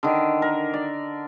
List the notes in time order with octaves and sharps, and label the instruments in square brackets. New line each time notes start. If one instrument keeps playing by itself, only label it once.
[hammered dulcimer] D3 D#3
A#4
D5